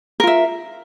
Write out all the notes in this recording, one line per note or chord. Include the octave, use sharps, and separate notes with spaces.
F4 A#4 E5